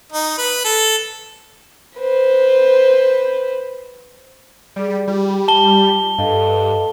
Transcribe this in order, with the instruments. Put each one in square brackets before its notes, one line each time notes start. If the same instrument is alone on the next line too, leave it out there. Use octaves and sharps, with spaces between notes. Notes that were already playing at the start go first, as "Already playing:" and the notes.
[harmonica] D#4
B4
A4
[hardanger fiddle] B4 C5
[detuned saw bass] G3 [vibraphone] G#4 D5
[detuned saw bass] G3 [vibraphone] F4 G4
[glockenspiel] A5 G7
[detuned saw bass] G2 [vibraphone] A4 D#5 F5